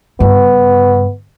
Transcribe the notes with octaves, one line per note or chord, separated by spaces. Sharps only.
G2 C#3 B3